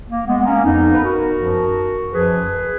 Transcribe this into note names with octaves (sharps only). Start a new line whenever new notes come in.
A#3
G#3 B3
B3
A#3 C#4
F2 F3 B3 D#4
B4
F#4 A#4
F#2 F3
F#2 F3 G#4 B4